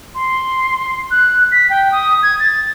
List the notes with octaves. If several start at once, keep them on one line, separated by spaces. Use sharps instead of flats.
C6
F#6
B6
G5
D#6
G#6
A6